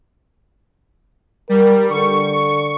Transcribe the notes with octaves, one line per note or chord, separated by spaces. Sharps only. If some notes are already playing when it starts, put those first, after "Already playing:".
G3 A#4
D3 C#6